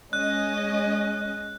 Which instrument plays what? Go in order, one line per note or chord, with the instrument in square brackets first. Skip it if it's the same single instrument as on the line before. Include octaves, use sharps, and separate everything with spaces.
[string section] G#3 C#4 D#5 [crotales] F#6